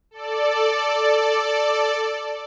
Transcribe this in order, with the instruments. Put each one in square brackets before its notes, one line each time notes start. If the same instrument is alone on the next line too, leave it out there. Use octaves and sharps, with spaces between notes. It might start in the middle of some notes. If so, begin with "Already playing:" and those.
[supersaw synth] A4 D5